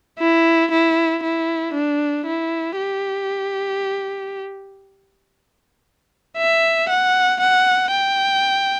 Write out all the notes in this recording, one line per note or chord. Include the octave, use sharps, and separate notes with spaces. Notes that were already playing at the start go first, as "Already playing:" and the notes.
E4
E4
E4
D4
E4
G4
E5
F#5
F#5
G5